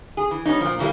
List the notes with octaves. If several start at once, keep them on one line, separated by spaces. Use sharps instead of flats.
G#4
E3
G3 B3 C#4 D#4
A#2 F3
A#2 E3 G3 A#3